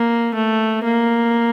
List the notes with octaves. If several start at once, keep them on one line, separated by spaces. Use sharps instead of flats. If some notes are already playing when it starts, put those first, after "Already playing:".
Already playing: A#3
A3
A#3